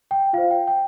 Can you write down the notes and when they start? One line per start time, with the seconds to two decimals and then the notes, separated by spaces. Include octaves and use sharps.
0.11 G5
0.33 F4 C5 F5
0.51 G5
0.68 G5